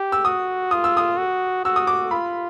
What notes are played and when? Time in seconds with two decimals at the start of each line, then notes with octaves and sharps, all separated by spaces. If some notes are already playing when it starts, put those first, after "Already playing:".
Already playing: G4
0.12 E6
0.25 F#4 D#6
0.71 F4 D#6
0.84 E6
0.97 D#6
1.18 F#4
1.65 F#4 E6
1.76 D#6
1.87 D6
2.11 F4 B5